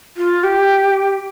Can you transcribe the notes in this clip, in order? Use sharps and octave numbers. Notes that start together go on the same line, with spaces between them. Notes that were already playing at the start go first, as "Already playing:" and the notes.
F4
G4